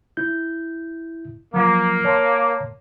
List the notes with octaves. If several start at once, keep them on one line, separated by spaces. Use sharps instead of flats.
E4 G6
F3 F#3 A#3
C#5 A5 C6